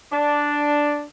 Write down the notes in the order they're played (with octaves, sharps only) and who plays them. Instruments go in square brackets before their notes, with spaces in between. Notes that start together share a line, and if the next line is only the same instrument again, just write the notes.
[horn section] D4